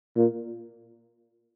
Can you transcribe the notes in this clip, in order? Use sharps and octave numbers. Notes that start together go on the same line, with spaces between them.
A#2